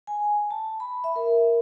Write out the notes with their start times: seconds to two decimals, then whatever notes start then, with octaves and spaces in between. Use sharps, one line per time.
0.07 G#5
0.51 A5
0.80 B5
1.04 E5
1.16 A#4